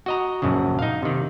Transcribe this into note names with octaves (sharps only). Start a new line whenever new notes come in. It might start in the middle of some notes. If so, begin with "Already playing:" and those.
F#4 D#5 A#5
A#1 F#2 C#3
D#4 F5
C3 D#3